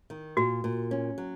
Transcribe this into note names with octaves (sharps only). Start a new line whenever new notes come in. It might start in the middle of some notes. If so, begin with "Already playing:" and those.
D#3
A#2 F#4
A#2
C#4
F#3